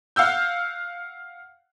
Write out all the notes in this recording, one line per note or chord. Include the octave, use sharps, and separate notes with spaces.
F5 F#5 E6 G6